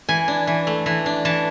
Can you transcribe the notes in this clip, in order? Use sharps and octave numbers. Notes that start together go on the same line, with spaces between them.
E3 G#5
D4
E3
A3
E3
D4
E3 A5